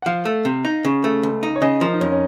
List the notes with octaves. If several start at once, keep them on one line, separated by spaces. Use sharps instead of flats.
F#5
F3 F5
A3
C3
D#4
C#3
A3
C#2
D#4
C#5
C#3 D#5
F3 A#4
D#4
F2 C#4
C#4